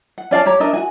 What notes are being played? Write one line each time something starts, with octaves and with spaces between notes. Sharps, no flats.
F#5
C#4 D5 F5 A5
G4 C#5 A#5
D4 A#4 D#5 E5
F#4 G#5